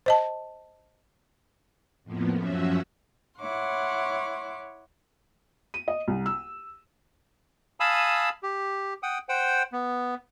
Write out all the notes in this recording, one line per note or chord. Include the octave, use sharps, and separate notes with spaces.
C5 D#5 A5
F2 A2 F3 A#3 B3
F#2 F3 C#4 F#4 E5
E4 C#5 F#5 C6 D6
D#7
D#5
C2
E6
F5 G#5 A5 B5 D#6 E6
G4
F#5 G5 D#6
C5 F#5 G5
B3